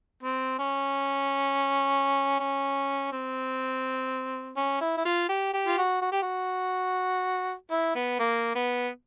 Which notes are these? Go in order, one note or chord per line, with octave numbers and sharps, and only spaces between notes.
C4
C#4
C#4
C4
C#4
E4
E4
F4
G4
G4
F4
F#4
F#4
G4
F#4
E4
B3
A#3
B3